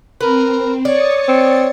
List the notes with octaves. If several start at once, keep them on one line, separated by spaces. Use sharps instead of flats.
C4 A#4 B4
C#5 D5 D#6 A6 C#7
C4